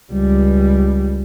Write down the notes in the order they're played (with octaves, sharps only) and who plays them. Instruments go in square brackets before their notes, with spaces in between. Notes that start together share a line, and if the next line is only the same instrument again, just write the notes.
[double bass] C#2 G3